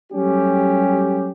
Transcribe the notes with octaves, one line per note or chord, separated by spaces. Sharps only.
F#3 G3 A3 C#4 G4